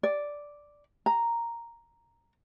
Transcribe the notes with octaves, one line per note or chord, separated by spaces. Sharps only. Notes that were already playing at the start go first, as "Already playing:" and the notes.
D5
A#5